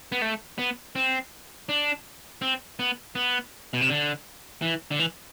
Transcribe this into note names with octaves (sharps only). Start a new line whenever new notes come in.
B3
A3
B3
C4
D4
C4
B3
B3
B2
C3
D3
E3
D3
E3